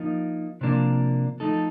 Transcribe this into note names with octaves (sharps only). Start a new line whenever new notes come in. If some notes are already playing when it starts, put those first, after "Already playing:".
Already playing: F3 A#3 D#4
C3 F3 A#3 D4
F3 A3 D#4 A4